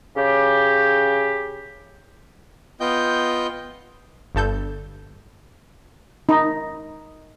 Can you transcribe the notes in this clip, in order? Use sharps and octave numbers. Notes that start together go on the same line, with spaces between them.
C#3 G4
B3 F4 D#5 G5 G6
G1 G2 A4 G6
D#4